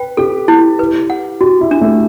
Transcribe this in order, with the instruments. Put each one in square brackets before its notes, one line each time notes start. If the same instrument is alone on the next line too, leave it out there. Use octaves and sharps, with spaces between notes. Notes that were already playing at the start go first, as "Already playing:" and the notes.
Already playing: [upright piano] B4 [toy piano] G5
[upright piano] G4 [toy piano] A4
[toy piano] E4
B4
F#5
[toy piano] F#4 [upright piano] G4
[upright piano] E4
[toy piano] D4
[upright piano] A3